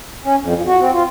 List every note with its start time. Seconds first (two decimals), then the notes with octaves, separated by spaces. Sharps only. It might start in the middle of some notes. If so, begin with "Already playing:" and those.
0.24 C#4
0.40 F2
0.55 F3
0.67 F#4
0.80 C4
0.93 F4